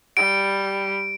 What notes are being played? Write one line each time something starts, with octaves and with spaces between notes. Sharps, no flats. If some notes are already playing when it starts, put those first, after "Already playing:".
G3 D7